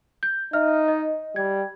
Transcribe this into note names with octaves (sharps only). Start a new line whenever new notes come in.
G6
D#4 E5 F6
D#5
G3 G#6